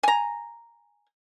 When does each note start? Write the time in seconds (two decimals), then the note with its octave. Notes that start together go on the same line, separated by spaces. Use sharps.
0.03 G#5 A#5